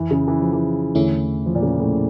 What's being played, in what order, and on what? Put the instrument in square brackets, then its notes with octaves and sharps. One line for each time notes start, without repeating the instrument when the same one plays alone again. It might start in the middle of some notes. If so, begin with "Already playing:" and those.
Already playing: [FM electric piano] F2 [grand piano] E3
[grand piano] C#3
E3
F3
E3
[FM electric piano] E2 D3 A3 C#4 E4
[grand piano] F3
A#2
C#3
A2